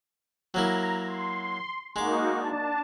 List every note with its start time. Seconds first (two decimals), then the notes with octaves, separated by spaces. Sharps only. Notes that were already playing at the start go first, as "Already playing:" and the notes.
0.54 F#3 A#3 E4 A#5
1.07 C6
1.96 G#3 A#3 D#4 F#4 D6
2.38 D4 A5